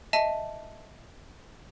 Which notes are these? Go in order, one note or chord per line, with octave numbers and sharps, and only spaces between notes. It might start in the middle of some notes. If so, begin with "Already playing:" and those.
D#5 E5 A5 D#7